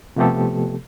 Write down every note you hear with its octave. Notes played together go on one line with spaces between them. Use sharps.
C3 F3 A3 B3 G4 A4